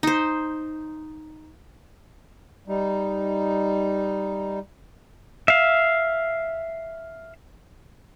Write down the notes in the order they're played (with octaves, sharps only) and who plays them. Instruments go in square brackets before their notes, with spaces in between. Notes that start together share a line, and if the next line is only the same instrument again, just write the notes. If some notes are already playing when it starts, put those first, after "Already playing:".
[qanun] D#4 C5
[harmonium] G3 D#4
[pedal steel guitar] E5 F5